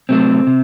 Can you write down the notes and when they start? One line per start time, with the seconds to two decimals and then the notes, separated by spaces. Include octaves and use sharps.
0.09 C3 F#3 A3 C4
0.47 C3